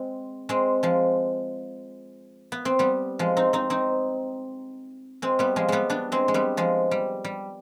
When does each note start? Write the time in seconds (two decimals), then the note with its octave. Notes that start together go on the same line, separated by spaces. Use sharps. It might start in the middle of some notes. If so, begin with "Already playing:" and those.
Already playing: G#3 C4
0.49 G#3 C4
0.83 F3 G#3
2.52 B3
2.65 C4
2.79 G3 B3
3.19 F3 G#3
3.37 C4 D#4
3.53 C4 D#4
3.70 C4 D#4
5.22 G#3 C4
5.39 G3 B3
5.56 F3 G#3
5.68 G3 G#3 B3
5.90 B3 D4
6.12 G#3 C4
6.28 G#3
6.34 G3 B3
6.57 F3 G#3
6.91 G3
7.24 G3